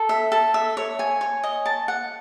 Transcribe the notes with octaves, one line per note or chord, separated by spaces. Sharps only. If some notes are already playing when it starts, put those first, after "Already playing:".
Already playing: A4
E5
A4
E5
C#5
G#5
C#5
D#5
A5
F#5